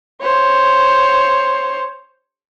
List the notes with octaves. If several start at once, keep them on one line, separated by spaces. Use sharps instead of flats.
C5 C#5